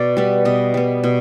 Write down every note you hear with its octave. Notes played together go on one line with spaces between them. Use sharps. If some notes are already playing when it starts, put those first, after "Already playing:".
Already playing: B2 D5
G3 B3
B2 D#5
G3 B3
B2